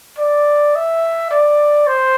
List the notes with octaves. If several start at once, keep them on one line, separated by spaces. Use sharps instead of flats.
D5
E5
D5
C5